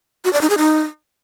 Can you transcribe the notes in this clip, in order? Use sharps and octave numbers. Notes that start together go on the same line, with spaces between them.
F#4
D5
D#4
G#4
D#4